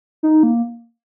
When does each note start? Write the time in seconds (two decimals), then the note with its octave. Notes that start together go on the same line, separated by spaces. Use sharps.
0.23 D#4
0.43 A#3